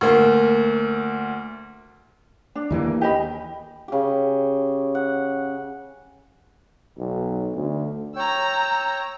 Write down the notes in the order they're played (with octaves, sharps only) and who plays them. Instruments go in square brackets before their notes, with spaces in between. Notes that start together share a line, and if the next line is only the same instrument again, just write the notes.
[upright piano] D2 A#3
[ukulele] D4
[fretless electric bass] D#2 E3 A#3
[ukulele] G4 D#5 B5
[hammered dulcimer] C#3 G4
F#5
[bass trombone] B1
D2
[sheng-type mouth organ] C#5 G5 [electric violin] A#5 E6